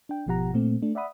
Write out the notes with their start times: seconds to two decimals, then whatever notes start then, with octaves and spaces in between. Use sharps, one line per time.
0.09 D4 G5
0.26 G#1 B2 F3 G4 F#5 A#5
0.54 A#2 A3 C4
0.82 A3 D4
0.95 D5 E5 F#5 B5 D#6